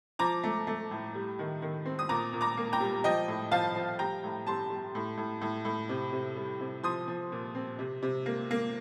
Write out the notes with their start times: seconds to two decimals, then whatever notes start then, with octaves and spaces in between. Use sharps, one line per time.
0.19 F3 A#5 D6
0.44 A3
0.67 A3
0.91 A2
1.15 G3
1.39 D#3
1.62 D#3
1.85 C4
1.99 D#6
2.09 A#2 A#5 D6
2.33 A#2
2.41 A#5 D6
2.57 A#3
2.73 G5 A#5
2.80 G3
3.04 F3 D#5 G5
3.28 A2
3.52 F3 F5 A5
3.76 F3
3.99 G3 G5 A#5
4.24 A2
4.47 G3 A5 C6
4.70 G3
4.95 A2
5.17 A2
5.41 A2
5.65 A2
5.89 C3
6.12 C3
6.37 G3
6.61 C3
6.83 F3 C6 D#6
7.08 F3
7.32 A#2
7.55 C4
7.79 C3
8.03 C3
8.26 A#3
8.51 A#3